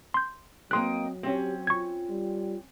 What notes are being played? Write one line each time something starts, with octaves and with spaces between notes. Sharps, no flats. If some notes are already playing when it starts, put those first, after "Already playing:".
C6 G6
F#3 A#3 C4 D#5 G5 C6 F#6
C4 C#4 G4
F4 C#6 G#6
G3